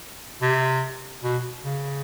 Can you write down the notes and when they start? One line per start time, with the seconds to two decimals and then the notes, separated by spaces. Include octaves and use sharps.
0.42 C3
1.23 B2
1.64 C#3